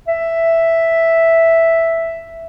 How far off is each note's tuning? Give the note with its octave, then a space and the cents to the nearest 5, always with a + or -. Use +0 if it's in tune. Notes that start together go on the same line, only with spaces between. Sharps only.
E5 +0